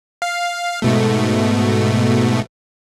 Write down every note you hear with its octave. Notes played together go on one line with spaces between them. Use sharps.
F5
G#2 B2 A3